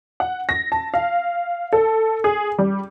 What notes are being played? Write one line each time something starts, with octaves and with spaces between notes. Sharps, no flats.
F#5
A#6
A5
F5
A4
G#4
G3